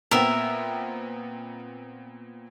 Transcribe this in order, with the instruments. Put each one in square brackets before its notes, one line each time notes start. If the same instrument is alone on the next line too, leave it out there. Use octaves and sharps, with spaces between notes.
[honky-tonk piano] A#2 B3 C4 [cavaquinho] A#4 E5